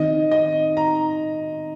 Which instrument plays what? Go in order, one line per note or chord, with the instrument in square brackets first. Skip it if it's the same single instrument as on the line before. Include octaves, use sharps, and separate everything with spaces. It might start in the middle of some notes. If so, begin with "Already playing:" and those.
Already playing: [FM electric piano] D#3 C4 D#4 [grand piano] D#5
[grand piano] D#5
A#5